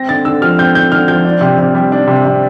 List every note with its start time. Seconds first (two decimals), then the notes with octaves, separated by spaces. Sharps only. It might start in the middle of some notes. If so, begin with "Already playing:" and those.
Already playing: C4 A#6
0.09 D3 A6
0.25 D3 E6
0.42 F3 F6
0.58 C4 G6
0.75 D3 G6
0.92 D3 F6
1.08 F3 G6
1.25 D4
1.41 C3
1.58 C3
1.75 G3
1.92 D4
2.08 C3
2.25 C3